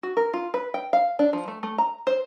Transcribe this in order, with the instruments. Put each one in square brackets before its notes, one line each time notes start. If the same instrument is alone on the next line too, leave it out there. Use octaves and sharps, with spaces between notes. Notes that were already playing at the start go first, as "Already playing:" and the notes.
[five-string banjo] F#4
A#4
F4
B4
G5
F5
D4
F3
A3
A3
A#5
C5